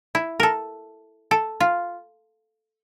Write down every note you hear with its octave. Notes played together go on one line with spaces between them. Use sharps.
E4
A4 A#4
A4
F4